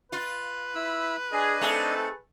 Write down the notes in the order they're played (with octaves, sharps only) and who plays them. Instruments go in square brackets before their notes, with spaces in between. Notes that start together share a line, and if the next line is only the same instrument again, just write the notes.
[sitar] F4 [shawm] B4
[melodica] E4 B5 E6
[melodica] D4 D#5 G#5 [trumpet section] G#4
[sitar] A3 G#4 [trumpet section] C4 D#4 A4